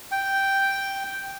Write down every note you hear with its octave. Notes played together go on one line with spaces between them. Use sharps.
G5